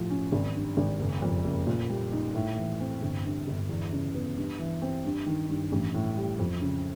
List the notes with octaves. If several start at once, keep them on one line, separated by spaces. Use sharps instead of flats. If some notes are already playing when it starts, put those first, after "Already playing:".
Already playing: A2 F3
C#4
G#1
G2
G#1
F#1
F2
F#1
A#2
G3
D#4
A2
E3
C4
G1
G2
G1
E2
C#3
B3
G2
E3
C4
G2
D#3
G2
A1
A2
G3
F2
C#3